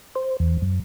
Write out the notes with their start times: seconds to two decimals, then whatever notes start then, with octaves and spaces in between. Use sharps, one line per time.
0.15 C5
0.40 E2
0.62 F#2